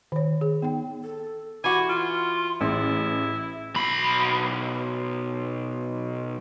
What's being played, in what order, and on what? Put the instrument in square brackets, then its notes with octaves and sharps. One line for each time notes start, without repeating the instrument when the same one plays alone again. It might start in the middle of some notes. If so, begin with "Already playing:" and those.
[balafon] D#3 C#5
G#4
B3 D#4 G5
[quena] A4
[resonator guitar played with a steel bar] E3 F#4 [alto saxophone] G#5 [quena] D6
[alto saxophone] F4 [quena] C6
[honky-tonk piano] A1 [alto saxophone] E4 [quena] G#4
[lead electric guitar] B1 B5